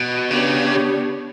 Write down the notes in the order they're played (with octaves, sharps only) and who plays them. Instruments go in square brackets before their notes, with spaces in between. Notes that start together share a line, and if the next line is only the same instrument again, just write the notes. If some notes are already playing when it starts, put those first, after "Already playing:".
Already playing: [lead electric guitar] B2
[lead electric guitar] C#3 [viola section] B3 D4 G4 C#5